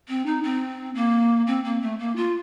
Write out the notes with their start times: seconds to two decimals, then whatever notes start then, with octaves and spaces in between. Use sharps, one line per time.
0.08 C4
0.26 D#4
0.43 C4
0.95 A#3
1.47 C4
1.64 A#3
1.81 A3
1.99 A#3
2.16 F4